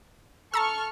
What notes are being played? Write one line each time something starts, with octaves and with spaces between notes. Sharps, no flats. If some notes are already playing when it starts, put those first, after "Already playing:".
A4 A5 A#5 C#6 E6 F6